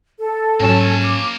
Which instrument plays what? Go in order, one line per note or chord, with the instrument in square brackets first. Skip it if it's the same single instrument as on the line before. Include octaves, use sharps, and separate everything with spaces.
[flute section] A4
[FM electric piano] G#2 F#3 [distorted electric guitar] A#3 A5 [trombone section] C#4
[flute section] D6